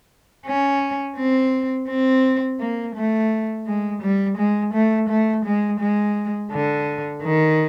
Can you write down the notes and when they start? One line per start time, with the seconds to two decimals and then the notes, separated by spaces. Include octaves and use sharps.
0.46 C#4
1.17 C4
1.89 C4
2.60 A#3
2.95 A3
3.67 G#3
4.02 G3
4.38 G#3
4.74 A3
5.09 A3
5.45 G#3
5.80 G#3
6.51 D3
7.23 D#3